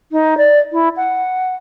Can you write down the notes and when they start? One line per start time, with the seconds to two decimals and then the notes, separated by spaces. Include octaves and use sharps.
0.12 D#4
0.38 D5
0.72 E4
0.97 F#5